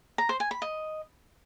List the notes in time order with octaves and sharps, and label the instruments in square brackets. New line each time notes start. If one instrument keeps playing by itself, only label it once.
[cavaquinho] A#5
C5
G#5
B5
D#5